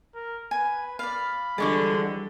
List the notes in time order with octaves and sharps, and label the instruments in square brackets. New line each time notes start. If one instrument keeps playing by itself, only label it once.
[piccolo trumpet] A#4
[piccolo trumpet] B4 [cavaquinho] G#5
[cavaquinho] D5 F5 [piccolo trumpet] B5
[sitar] D3 G#3 [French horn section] E3 F3 G3 [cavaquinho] D5 C#6 D6